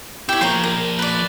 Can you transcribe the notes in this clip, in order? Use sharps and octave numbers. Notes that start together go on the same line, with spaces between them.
E4 G4 C#5
F3 A#3 C5 C#5 A#5
A#4
B4 D5